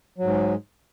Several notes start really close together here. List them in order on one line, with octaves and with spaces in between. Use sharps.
F#3 G#2 G#3